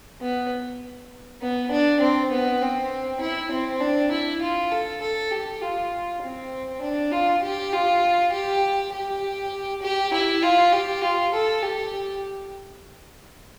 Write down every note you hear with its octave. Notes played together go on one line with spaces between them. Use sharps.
B3
B3
D4
C4
B3
C4
E4
C4
D4
E4
F4
A4
A4
G4
F4
C4
D4
F4
G4
F4
G4
G4
G4
E4
F4
G4
F4
A4
G4